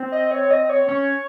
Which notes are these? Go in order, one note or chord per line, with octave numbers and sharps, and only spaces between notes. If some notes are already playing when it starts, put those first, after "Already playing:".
Already playing: C4
D#5
C#5
D#5
C#5
C#4 C#5